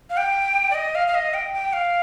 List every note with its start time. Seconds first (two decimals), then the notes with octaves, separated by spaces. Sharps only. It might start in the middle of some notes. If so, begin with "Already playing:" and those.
0.10 F5
0.17 G5
0.71 D5
0.75 D#5
0.95 F5
1.08 F5
1.15 D#5
1.34 G5
1.54 G5
1.73 F5